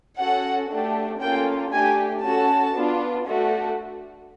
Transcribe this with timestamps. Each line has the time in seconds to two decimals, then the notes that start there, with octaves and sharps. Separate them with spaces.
0.19 C#4 F#4 A4 F#5
0.70 A3 D4 G4
1.22 A#3 C#4 F4 A4 G5
1.72 A3 D4 G4 G#5
2.24 C#4 F#4 A4 A5
2.75 B3 D4 F4
3.25 A3 D4 F#4 A4